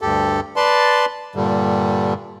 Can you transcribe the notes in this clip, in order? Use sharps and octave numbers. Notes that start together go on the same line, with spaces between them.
D2 G2 G4 A4
B4 D5 A5 C6
G2 A#2 D3 G3